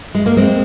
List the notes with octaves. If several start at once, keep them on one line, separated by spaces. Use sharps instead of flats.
G#3
A#3
G#3 C4